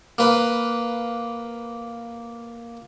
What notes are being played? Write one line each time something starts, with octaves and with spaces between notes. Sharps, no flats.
A#3 B4